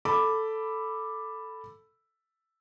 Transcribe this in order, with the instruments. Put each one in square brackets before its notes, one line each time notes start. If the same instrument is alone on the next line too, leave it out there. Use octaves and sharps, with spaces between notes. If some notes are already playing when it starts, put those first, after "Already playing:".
[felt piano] A4 B5 D6